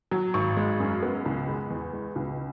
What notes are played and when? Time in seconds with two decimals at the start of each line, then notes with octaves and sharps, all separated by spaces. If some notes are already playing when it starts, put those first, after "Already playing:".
0.11 F#3
0.34 G#1 C#6
0.57 G#3
0.80 F#2
1.02 B3
1.26 C#2 B5
1.48 G#3
1.70 E2
1.93 G#3
2.16 C#2